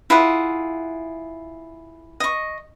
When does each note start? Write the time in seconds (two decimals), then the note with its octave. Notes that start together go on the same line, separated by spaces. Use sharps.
0.10 E4 F4 G#4 F#5
2.20 D#5 C#6